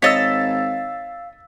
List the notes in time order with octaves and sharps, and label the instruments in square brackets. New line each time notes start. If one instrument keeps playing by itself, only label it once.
[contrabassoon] G#1 [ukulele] C#5 D#5 [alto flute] F5 [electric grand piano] E6 A6 B6